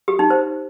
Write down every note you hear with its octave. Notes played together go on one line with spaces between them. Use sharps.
G4
D#4
C5